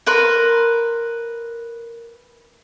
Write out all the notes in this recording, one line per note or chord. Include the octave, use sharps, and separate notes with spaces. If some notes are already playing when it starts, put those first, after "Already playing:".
A#4 B4 C6